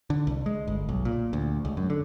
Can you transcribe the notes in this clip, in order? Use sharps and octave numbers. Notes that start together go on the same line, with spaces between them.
D3
C2
G#3
G1
B1
A#2
D2
C#2
F#2
D3